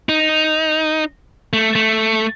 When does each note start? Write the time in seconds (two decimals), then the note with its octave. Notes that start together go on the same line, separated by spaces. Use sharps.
0.09 D#4
1.53 A3
1.75 A3